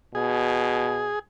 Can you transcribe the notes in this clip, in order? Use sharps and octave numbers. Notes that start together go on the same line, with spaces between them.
B2 G#4